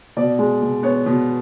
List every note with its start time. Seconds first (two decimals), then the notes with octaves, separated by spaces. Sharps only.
0.17 B2 D5
0.39 G#3
0.62 B2
0.83 B3 C#5
1.06 B2